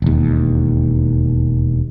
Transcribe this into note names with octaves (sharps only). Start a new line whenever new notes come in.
E1 D#2